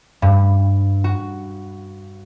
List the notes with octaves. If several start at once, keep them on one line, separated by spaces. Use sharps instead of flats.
G2
F#4